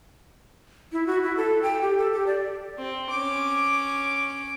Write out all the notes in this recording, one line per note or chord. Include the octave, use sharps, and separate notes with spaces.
E4
F#4
E4
A4
G5
G4
A4
G4
D5
C4
C#4 D6